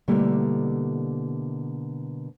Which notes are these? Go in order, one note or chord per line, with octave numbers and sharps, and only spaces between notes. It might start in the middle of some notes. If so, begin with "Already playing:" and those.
B2 D3 G3 A3 A#3 E4